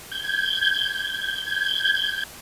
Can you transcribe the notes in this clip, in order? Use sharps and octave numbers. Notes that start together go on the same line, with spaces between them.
G6 G#6